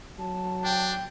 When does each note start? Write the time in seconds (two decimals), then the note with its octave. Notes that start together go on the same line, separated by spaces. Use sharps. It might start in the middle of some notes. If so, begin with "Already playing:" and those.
0.18 F#3 A5
0.65 D4 G5